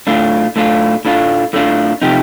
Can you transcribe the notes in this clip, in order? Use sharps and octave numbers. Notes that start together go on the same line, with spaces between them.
A2 A3 D4 F4
A2 A3 D4 F4
A2 A3 D4 F4
A2 A3 D4 F4
C3 F3 A3 D#4 G4